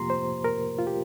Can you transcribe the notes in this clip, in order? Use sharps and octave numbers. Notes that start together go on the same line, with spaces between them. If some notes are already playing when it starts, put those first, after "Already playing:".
Already playing: F2 C3 F3 A#3 F4 G4 A#5 C6
C5
A#4
F4
G4